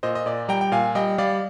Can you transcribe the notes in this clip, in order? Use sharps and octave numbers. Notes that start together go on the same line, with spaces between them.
A#2 C5 D#5
D#5
A#2 D5
G3 G5 A#5
G5
A#2 F5 G#5
G3 D#5 G5
G3 D5 F5